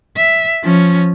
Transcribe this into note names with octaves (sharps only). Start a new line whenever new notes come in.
E5
F3 C#4